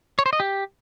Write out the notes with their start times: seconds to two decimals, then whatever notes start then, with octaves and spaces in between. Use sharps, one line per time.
0.19 C#5
0.26 C5
0.33 D#5
0.40 G4